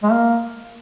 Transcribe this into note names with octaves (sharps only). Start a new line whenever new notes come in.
G#3
A#3